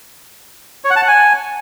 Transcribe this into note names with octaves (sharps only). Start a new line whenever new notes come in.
C#5
F#5
A5
F#5
G#5